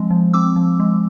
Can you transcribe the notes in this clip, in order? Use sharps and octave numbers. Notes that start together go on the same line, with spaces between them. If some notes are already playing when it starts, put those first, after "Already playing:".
Already playing: F3 G#3 C4
F3
C4 D6 E6
F3
G#3